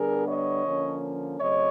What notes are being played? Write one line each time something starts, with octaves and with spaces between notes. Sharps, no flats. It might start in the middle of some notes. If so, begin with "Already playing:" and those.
Already playing: D3 G3 B3 D4 G#4 A#4
C#5 D#5
D3 F3 A#3 C#4
C#3 F#3 A3 C4 C#5 D#5